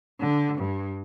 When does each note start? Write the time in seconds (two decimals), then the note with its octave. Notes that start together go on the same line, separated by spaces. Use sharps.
0.19 D3
0.57 G2